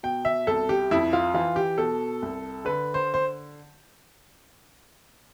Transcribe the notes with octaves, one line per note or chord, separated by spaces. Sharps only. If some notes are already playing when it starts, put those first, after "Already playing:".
B2 G5
E5
C2 A4
G4
F2 E4
F4
E3 F4
G4
B2 A4
C2
D3 B4
C5
C5